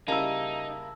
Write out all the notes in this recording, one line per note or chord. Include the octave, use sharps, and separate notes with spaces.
C#3 G3 A#3 D#4 E4 A5 E6